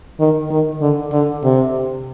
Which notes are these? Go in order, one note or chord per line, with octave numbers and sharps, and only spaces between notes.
D#3
D#3
D3
D3
C3